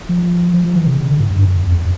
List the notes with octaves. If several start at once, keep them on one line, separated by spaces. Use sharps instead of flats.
F3
F3
F3
E3
C3
C#3
D3
G#2
G2
F#2
F2
F2